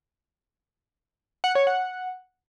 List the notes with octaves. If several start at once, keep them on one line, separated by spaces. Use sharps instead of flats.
F#5
C#5
F#5